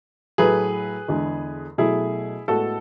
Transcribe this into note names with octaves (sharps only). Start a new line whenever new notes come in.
A2 F#3 A3 G#4 B4
E2 D3 G#3
B2 F#3 A3 E4 G#4
A2 G#3 B3 F#4 A4